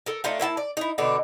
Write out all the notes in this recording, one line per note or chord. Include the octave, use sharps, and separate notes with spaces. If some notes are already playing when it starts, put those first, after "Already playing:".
A4 A#4
A3 D4 D#4 F4
A#3 E4 F#5 A5
D5
D#4 E4
B2 D3 D4 D#4